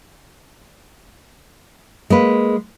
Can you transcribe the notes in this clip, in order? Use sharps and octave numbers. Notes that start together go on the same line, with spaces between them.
G#3 A#3 B4